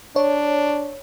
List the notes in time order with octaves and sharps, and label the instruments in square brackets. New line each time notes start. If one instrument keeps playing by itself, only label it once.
[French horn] D4 [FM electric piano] C#5